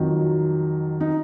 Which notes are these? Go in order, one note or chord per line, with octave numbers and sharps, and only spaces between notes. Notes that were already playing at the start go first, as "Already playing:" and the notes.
Already playing: F2 D#3 F#3
D#4